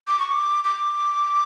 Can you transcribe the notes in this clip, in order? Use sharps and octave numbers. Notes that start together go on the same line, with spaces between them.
D6
C#6
D6
D6